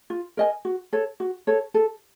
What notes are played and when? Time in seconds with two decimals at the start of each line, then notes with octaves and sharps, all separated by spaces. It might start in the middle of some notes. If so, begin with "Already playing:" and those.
0.10 F4
0.37 A#4 D#5 G#5
0.65 F#4
0.93 A4 C#5
1.20 F#4
1.47 A4 C#5
1.74 A4